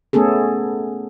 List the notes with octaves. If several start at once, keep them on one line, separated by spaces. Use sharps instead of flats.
A3 B3 C#4 G#4 A4